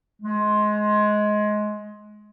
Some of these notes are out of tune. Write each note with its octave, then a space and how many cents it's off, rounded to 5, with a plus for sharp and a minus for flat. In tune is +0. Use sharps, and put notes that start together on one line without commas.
G#3 +20